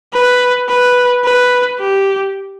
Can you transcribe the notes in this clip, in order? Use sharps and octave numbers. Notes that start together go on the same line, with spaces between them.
B4
B4
B4
G4